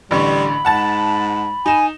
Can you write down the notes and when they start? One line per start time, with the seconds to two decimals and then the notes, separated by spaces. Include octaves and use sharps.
0.11 A1 D3 G3 B5 C#6
0.65 G#2 F#5 A5 A6
1.66 D#4 G#5 E7